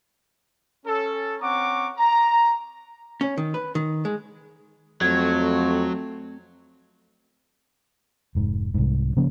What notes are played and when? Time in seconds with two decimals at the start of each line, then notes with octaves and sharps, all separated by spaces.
0.85 C#4 A4
1.40 C4 C#4 F#5 A#5 C#6 D6
1.97 A#5
3.21 C#4
3.38 D#3
3.54 B4
3.75 D#3
4.05 G#3
5.01 F2 F#3 A3 C4 G#6
8.35 F1 G#2
8.74 C2 G#2
9.17 C#3 F3 A#3 C#4